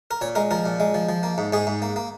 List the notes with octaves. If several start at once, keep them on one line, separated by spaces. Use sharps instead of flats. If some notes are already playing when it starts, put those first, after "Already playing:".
A#4
A#2 C#5
G#3 A#4
F3 A#4
A#2
G#3
F3
F3
A#3
G#2
G#2 G#4
G#2
A#3
A#3